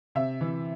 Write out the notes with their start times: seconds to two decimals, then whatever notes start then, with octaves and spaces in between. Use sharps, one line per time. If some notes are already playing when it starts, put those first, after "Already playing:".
0.15 C3 E5
0.41 E3